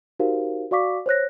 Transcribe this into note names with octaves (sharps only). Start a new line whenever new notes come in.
D#4 F#4 G4 A#4 C5 F5
F#4 D5 F5 C#6 D6 B6
C5 C#5 F#6 A#6